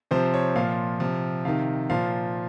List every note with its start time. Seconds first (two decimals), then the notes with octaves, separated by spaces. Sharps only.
0.11 C3 F3 C5
0.34 C#5
0.55 A#2 F3 F5
1.00 C3 F3
1.45 C3 D#3 F5
1.90 A#2 F3 F5